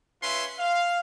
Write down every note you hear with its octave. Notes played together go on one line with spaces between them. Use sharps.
C#4 F4 B4 E5 C6
F5